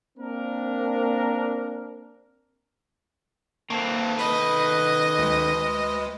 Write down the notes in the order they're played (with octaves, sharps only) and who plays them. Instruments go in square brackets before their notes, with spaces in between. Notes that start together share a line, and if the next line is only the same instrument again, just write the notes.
[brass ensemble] A#3 C4 D4 A#4
[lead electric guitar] D#3 A4 [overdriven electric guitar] A#3 C4
[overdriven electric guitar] B4 [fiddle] D#5
[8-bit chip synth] D2 G#3